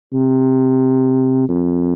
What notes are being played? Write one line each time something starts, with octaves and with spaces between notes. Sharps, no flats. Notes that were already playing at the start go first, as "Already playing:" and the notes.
C3
F2